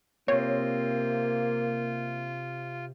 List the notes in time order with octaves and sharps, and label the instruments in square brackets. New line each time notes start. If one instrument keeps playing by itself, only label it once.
[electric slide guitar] C3 C4 [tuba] A#3 [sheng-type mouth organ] F4 [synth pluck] C#5